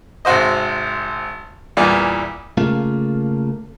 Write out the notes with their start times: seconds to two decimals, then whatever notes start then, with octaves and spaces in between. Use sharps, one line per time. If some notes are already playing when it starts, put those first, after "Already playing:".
0.25 G#1 C3 F#4 C5 D#5
1.77 E2 A#2 E3 G3 B3
2.57 C#3 A3 A#3 F4